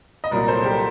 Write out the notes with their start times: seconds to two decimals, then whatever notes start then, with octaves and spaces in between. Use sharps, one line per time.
0.24 D#5
0.31 C2 A#2 F#3 A#4 D5
0.47 A4 C5
0.64 G4 A#4